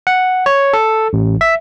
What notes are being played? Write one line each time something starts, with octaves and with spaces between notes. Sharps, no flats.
F#5
C#5
A4
A1
E5